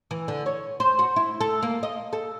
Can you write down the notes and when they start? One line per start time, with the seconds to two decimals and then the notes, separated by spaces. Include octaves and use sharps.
0.11 E3
0.28 D3
0.46 C#5
0.80 C5
0.99 F#4
1.16 E4
1.41 A4
1.63 A#3
1.83 D#5
2.13 A4